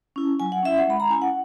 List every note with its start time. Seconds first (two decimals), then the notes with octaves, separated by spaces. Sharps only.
0.16 C#4 E4
0.40 F#3 G#5
0.52 F#5
0.63 C#4 E4 E5
0.78 F#5
0.87 G#3 B5
1.00 A#5
1.10 C#4 E4 G#5
1.22 F#5